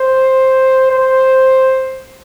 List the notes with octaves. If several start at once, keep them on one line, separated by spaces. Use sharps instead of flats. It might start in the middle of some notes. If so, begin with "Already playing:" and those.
Already playing: C5
C5